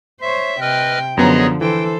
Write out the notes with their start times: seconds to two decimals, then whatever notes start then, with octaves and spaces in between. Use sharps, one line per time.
0.21 C5 C#5 E5
0.61 C3 B4 D#5 G5 F6
1.17 F#2 D3 F3 B3 G#4 C#5 D#5 A#5
1.61 E3 A4 C5 G5